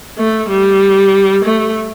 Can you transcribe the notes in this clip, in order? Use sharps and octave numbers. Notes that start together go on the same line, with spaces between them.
A3
G3
A3